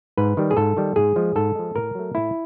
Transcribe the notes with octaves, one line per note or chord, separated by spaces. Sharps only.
G#2 B4
D#3 G3
G#4
G#2 A4
D#3 G3
G#2 G#4
F3 G#3
G#2 A4
F3 G#3
A2 A#4
F#3 A3
A2 E4